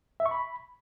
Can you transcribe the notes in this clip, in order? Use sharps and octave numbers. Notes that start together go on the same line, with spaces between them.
E5
C#6
B5